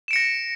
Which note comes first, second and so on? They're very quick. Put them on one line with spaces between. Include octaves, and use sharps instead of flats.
E7 D7 C#7 A#6